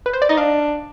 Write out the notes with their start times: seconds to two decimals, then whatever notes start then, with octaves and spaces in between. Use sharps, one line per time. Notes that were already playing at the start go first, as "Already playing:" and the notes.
0.06 B4
0.13 C5
0.22 D5
0.29 D#4 D#5
0.37 D4 F5